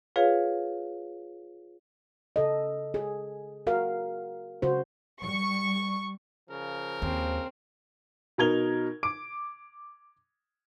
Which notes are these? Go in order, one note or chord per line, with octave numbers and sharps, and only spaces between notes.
F4 G#4 B4 C#5 F5
C#3 A4 D#5
G#4
F#4 A#4 F5
C#3 F#4 C5
G3 C#6
C#3 F3 A#4
D#2 C4
B2 D#4 A#4 G#6 F7 G7
D6 D7